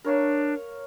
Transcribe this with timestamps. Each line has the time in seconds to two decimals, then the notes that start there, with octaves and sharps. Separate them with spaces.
0.05 D4 A#4 C#5 F5